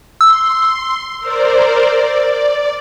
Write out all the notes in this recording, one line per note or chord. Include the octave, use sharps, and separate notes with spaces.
C6 E6
A#4 C5 D5
D5